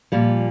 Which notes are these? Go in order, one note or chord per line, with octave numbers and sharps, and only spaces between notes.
A#2 F3 G3